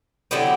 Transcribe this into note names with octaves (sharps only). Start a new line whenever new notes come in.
D3 F#3 B3 E4 G4